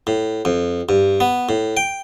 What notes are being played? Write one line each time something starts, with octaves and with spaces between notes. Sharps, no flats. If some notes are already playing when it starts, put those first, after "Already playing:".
A2
F2
G2
B3
A2
G5